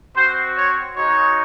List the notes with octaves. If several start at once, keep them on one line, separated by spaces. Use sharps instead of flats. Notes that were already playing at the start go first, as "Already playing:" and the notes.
C4 F#4 C5
C#5
G#3 D#4 F#4 C#5